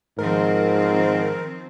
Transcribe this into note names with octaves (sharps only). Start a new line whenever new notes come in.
G#2 D#3 F3 C4 A#4